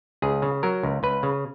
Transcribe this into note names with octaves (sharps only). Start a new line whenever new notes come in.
C#2 G#4
C#3
F#3 A#4
C#2
C#2 B4
C#3